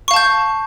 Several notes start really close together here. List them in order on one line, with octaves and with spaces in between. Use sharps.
C#6 F5 A5 G6